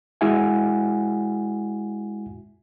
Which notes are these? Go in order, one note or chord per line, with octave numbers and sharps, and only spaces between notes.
G#3 E4 F#4 E5 F#5 G#5